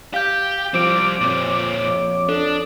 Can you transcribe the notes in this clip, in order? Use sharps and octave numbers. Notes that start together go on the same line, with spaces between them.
G4 F5 G6
F3 G3 C4 D6 D7
F2 A#2 C4 C#5
D4 A4